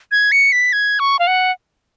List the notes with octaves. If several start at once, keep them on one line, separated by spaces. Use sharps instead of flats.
G#6
C#7
B6
G#6
C#6
F5
F#5